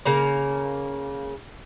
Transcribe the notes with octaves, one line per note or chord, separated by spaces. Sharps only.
C#3 A#3 A#5